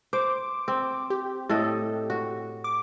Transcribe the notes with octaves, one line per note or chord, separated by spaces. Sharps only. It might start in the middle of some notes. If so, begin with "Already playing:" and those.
C5 D6
C4
G4
A2 A4 D#5
F#4
D6